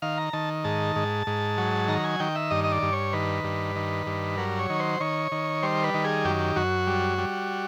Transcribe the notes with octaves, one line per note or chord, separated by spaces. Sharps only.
D#3 F5
A#5
D#3 A5
G#2 A5
G#2
G#2
F#3
D#3 A#5
G#5
D#3 G5
E5
G2 D#5
D#5
D5
G2
C#5
D#3 B4
G2
D#3
G2
F#3 A#4
C#5
D#3
C5
D#3 C#5
D#3
G3 C5
B4
D#3
G#4
F#2 G4
F#2 F#4
G3
G3